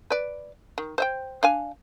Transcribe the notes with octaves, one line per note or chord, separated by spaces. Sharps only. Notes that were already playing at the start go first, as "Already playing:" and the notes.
B4 D5
D#3
C5 E5 G5
D4 F5 G#5